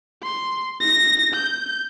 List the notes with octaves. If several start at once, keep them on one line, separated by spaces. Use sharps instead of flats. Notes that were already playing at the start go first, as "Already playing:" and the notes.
C6
A#6
G6